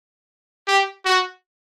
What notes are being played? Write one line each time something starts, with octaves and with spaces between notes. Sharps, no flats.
G4
F#4